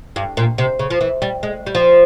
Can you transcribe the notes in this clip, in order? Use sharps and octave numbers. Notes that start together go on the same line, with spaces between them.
G2
A#2
C3
C#3
F3
E3
G3
G#3
G3
F3